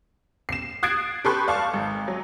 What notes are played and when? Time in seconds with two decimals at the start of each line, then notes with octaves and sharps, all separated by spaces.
0.49 C7 E7
0.83 D#6 F#6 G#6 A6 C7 D7
1.25 G4 A4 B4 C6 C#6 F#6
1.48 D5 F5 A5 C#6
1.73 G#1
2.08 F#3